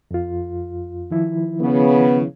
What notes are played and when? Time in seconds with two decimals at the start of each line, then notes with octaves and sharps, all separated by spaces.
0.11 F2 F4
1.11 D#3 F3 E4
1.61 C#3 B3